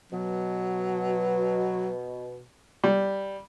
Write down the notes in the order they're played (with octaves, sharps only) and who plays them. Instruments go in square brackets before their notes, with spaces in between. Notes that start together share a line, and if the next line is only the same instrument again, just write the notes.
[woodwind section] B2 [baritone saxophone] F#3
[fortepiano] G3